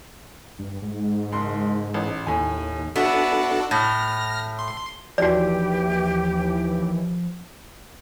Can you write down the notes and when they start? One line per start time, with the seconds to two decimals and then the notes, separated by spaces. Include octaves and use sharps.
0.59 G2
0.82 G#2
1.32 F#1 C6
1.94 A1
2.27 D#2 A2 G#5
2.96 B3 D4 E4 F#4 A4
3.71 A2 F6 A#6
4.59 C6
5.18 D#2 E3 F3 F#4 G4 D5